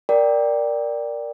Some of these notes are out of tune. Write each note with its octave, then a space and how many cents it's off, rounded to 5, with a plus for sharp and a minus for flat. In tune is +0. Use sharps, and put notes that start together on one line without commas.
A#4 +0 D5 +0 G5 +0